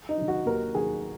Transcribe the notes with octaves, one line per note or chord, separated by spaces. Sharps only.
D#4
D#3 F#3
F#4
D#2 A#4
D#3 F#3 G#4